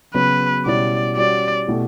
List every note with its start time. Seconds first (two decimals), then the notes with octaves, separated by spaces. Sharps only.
0.14 C#3 F#3 B3 F#4 B4
0.66 B2 G3 C#4 E4 D5
1.16 G3 C#4 F#4 D5
1.68 B2 A3 E4 G4